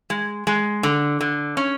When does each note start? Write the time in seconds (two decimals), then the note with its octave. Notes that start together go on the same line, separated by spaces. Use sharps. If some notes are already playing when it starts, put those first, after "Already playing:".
0.10 G#3
0.47 G#3
0.83 D3
1.21 D3
1.57 C#4